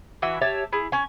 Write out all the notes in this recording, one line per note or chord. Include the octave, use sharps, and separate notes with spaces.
E3 F#4 E5
G4 C#5 E5 A5
E4 G#4
C#4 G#5